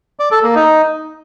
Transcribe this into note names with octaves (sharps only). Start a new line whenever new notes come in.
D5
A4
A#3
D#4